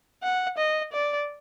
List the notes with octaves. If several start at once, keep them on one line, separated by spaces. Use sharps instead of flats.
F#5
D#5
D5